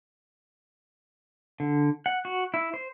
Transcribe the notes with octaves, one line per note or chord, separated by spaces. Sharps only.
D3
F#5
F#4
E4
C5